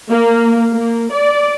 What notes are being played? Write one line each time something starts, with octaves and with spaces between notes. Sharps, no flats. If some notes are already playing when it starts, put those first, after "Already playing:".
A#3
A#3
D5